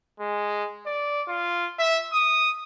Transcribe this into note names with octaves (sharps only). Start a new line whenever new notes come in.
G#3
D5
F4
E5
D#6